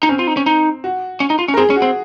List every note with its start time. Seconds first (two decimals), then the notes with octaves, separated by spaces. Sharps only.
0.03 D#4
0.09 C4 C#4
0.19 F4
0.27 D#4
0.37 C#4
0.46 D#4
0.84 F#4
1.20 C#4
1.30 D#4
1.39 F4
1.48 C#4
1.54 A#4
1.57 C4 G#4
1.70 C#4
1.76 F#4
1.82 C4